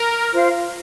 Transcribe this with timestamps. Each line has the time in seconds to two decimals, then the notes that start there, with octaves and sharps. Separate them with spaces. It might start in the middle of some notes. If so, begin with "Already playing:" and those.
Already playing: A#4
0.34 F4 C5 F5